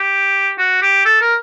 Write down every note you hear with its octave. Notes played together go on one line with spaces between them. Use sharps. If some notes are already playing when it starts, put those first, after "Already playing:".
Already playing: G4
F#4
G4
A4
A#4